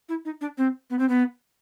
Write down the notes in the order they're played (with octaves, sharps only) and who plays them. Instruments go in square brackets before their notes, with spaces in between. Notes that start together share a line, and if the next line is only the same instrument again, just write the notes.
[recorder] E4
D#4
D4
C4
B3
C4
B3